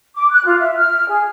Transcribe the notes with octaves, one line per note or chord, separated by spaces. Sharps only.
D6
F#6
F4
E5
F6
G#4